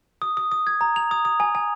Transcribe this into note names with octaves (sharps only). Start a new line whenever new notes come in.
D#6
D#6
D#6
G#6
A#5
F7
D#6
D#6
G#5
G#5